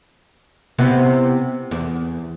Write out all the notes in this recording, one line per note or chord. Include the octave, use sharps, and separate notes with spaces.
C3 B3 E4
E2